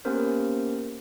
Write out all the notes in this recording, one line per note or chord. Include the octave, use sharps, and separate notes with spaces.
A#3 B3 C#4 G4 A#4 C5